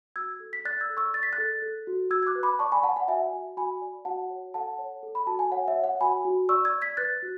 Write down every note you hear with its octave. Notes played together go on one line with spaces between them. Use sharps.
F#4 E6 G#6
A4
B6
D5 F#6 A6
E6 G#6
A4
C#6 E6
D5 A6
B6
F#6 A6
A4
A4
F#4
F#4 E6 G#6
G#6
D6 F#6
B4
B5 D6
D5 A5 C#6
G#5 B5
D5 F#5 A5
F#5
F#4 E5 G#5
F#4
F#4 G#5 B5
D5
F#4 F#5 A5
C#5
A4 F#5 A5
C#5
A4
B5
F#4 A5
G#5
C#5 F#5
E5
C#5
F#5
F#4 G#5 B5
F#4
D5 C#6 E6
E6 G#6
D5
G#6 B6
B4 F#6 A6
F#4